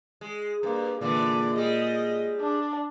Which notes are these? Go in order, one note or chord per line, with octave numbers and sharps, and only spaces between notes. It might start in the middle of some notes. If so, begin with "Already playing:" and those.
G#3
G2 A#3
A#2 D3 E3 G#3 D5
G3 G#3 D#5
D4